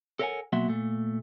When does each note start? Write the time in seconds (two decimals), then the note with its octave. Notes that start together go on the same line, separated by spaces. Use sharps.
0.19 A4 A#4 C#5 E5 F#5 G#5
0.53 B2 F#3 A#3 E5 F#5 C6
0.68 A#2 A3